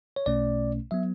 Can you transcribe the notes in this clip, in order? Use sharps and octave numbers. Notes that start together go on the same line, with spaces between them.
C#5
B1 B2 A3 C#4 D5
F#3 B3 E5